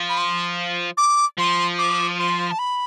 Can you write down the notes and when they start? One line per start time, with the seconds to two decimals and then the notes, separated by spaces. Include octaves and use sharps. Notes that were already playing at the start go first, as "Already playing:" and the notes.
Already playing: F3
0.09 B5
0.18 C6
0.97 D6
1.38 F3 C6
1.78 D6
2.19 C6
2.51 A5
2.59 B5